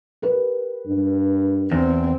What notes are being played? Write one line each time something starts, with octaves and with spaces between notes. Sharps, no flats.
G4 A#4 B4
G2
E2 C4